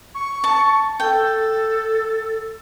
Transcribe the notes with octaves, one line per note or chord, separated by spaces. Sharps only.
C#6
A5
A4 G5